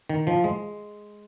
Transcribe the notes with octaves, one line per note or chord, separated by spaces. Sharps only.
D#3
F3
G#3